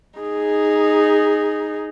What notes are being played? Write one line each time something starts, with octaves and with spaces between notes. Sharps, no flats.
D#4 G#4